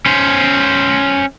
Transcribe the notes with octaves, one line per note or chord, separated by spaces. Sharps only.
C#4 C5